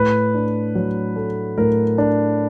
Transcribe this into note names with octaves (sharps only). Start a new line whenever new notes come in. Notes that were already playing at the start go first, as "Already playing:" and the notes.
Already playing: A2 B4
D4
F#3
A3
A2 A#4
D4